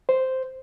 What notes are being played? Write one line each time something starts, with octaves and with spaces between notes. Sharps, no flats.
C5